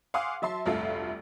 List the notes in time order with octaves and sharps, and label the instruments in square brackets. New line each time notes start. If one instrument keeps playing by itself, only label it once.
[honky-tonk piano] F5 F#5 G#5 C6 D6 D#6
F#3 E5 A5 C6 C7
F1 D2 G2 F4 A4 E5